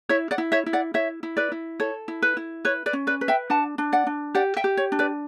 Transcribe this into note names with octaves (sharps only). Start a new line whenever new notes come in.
E4 C#5 E5
D5 F#5
E4
C#5 E5
E4
D5 F#5
E4 C#5 E5
E4
B4 D5
E4
A4 C#5
E4
B4
E4
B4 C#5
B4 D5
C#4
B4 D5
B4
E5 G5
D4 F#5 A5
D4
D5 F#5
D4
G4 D5 F#5
E5 G5
G4
C#5
D4
B4 D5